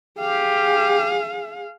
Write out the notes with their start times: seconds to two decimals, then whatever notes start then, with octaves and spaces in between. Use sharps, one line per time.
0.18 G4 G#4 F5